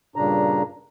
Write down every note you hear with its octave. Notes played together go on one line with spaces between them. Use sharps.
G2 A#2 C#3 D4 A#5